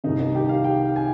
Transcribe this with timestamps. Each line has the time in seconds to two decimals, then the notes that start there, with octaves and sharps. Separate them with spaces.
0.04 C2 C3 D#3 D#4
0.20 D#4
0.35 G4
0.49 F5
0.64 G5
0.96 G#5